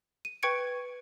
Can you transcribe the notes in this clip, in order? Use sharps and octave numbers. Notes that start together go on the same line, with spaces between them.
D#7
B4 G5 C#6 G#6 C#7 D7